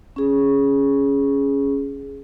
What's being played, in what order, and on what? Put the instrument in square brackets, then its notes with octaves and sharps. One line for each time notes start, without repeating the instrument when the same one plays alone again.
[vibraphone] C#4 G#4